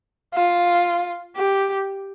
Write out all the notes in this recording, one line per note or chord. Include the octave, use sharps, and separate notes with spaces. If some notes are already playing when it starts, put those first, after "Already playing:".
F4
G4